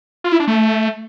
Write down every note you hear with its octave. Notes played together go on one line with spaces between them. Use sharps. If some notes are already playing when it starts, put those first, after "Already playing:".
F4
E4
D4
A3